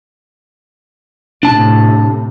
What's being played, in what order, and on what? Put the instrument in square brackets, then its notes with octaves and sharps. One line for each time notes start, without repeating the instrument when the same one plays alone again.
[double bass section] A2 C3 [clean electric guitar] D4 A5